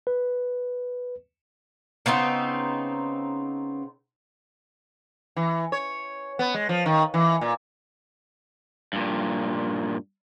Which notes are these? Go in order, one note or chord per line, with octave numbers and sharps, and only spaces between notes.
B4
C#3 B3 C4 D#4
E3
C#5
B3
G#3
F3
D#3
E3
A#2
G2 A#2